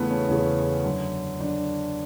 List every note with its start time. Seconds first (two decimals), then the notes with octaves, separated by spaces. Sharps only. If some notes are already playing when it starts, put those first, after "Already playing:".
Already playing: E2 C#3 E3 A3 B3
0.10 C#4
0.28 E2 C#3 E3 C#4
0.84 F#2 D3
1.40 F#2 D3 D4